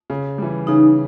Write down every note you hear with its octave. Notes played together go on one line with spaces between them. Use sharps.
C#3
E3 G3
C#3 D#4